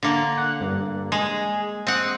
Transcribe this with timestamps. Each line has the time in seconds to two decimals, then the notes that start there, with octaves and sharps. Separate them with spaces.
0.03 D3 A#3
0.37 F#5
0.61 G2
1.12 G#3 G#4
1.87 C4 D#5 F#5